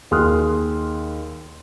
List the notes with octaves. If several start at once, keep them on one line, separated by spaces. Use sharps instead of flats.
D#2 G#4 C6 D#6 F6 F#6